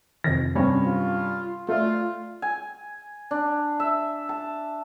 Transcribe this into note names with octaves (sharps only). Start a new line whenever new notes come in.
F2 C3 D#3 A#6
G2 C3 F#3 C4 C#4
F4
A3 F4 D5
G#5
D4
E5
A5